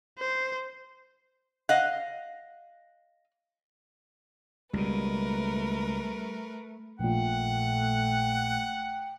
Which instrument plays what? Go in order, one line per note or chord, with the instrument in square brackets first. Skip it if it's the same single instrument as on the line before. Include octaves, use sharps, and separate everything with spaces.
[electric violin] C5
[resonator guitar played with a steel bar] D#5 F5 [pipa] F#5
[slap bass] C#2 B2 [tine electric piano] G3 [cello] A3 [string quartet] A#4 B4
[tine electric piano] A#1 A#2 [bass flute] A3 [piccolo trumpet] F#5 [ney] G5